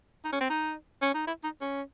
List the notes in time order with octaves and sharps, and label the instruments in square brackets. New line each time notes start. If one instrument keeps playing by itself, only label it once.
[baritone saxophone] D#4
C#4
C4
D#4
C#4
D#4
E4
D#4
C#4